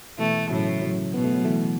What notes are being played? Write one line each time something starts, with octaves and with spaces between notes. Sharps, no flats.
B2 E3 A3
A2 C#3 F#3
C#3 F#3
B2 B3
A3
F#3
E3 A3